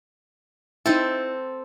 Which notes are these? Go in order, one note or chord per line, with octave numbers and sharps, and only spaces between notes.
C4 D#4 E4 A4